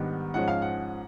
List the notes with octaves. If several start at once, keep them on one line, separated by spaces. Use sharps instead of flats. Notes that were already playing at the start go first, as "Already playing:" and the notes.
Already playing: G#2 D#3 G3 B3 D4
G#2 F3 G#3 C#4 F#5
F5
F#5